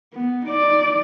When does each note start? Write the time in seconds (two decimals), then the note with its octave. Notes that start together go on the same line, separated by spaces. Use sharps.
0.14 B3
0.46 D#4 D5